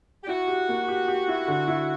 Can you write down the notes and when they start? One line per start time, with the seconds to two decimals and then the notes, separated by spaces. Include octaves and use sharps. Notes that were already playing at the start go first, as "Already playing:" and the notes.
0.23 G4
0.28 E4 F#4
0.48 G4
0.68 A#3
0.88 G4
1.08 G4
1.28 E4
1.48 D3
1.68 E4